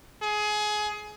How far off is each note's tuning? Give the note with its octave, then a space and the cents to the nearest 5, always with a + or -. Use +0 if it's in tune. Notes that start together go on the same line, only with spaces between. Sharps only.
G#4 +20